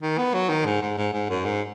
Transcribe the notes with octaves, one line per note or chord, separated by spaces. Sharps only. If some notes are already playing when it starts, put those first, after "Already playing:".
D#3
B3
F#3
D#3
G#2
G#2
G#2
G#2
F#2
G#2